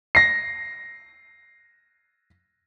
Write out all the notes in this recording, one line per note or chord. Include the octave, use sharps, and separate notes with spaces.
A#6 C7